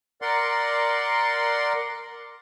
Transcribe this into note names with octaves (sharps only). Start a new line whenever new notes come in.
A#4 D5 F#5 C6